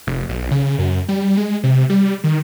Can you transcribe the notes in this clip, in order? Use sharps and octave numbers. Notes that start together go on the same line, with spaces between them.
F1
B1
C#3
F#2
G3
G#3
C3
G3
D#3